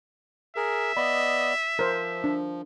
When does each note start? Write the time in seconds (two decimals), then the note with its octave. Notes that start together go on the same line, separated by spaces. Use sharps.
0.56 G#4 A#4 E5
0.97 B3 D5 D#5 B5
1.79 F3 A#4 C5
2.24 D4